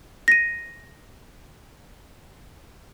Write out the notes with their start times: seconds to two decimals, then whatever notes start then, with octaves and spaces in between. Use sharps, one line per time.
0.28 A#6 D#7